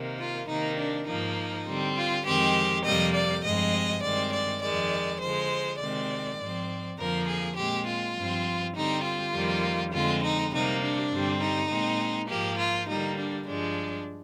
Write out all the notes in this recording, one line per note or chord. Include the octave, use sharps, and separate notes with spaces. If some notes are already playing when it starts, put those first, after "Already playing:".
Already playing: C3 D#3 A#3
F4
C3 D#3 A#3 D#4
D4
G#2 F3 A#3 D#4
D3 G3 C4
F4
F2 D#3 G#3 C4 G4
F2 C3 G3 A#3 D#5
D5
G2 F3 G#3 C4 D#5
G2 D#3 G#3 C4 D5
D5
F2 D#3 G#3 D5
D3 F3 G#3 C5
C3 D#3 G#3 C4 D5
G#2 F3 C4
F2 D3 F3 A#3 A#4
G#4
A#2 G#3 C4 G4
F4
G2 F3 C4
D3 G3 C4 D#4
F4
F2 D#3 G3 A#3
F2 D3 G#3 C4 F4
D#4
C3 G3 A#3 D#4
D4
G2 D3 G3 C4
D#4
A#2 G#3 C4
G#2 F3 A#3 G4
F4
D3 G3 A#3 D#4
D4
G2 F3 G#3 D4